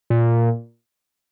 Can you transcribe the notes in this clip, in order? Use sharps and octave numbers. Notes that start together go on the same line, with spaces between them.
A#2